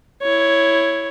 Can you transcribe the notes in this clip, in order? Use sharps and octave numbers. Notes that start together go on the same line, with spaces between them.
E4 C#5